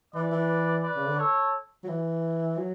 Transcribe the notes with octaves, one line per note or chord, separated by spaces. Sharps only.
E3 B4 D5
E3
B4 D5
C#3
D3
A4 C#5
F#3
E3
F#3